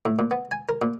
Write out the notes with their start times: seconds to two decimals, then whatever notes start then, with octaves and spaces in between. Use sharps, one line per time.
0.05 A2
0.19 A#2
0.31 B3
0.51 G#5
0.69 A#4
0.82 A#2